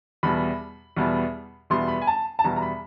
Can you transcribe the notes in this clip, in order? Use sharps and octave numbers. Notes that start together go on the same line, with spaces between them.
E2 B2 G3 B3 E4 B5
E2 B2 G3 B3 E4
E2 B2 G3 B3 E4 C6
B5
G#5
A5
A5
E2 B2 G3 B3 E4 A#5
A#5
B5